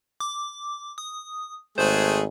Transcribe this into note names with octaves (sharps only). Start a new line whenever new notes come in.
D6
D#6
G#1 G#3 A3 G#4 C5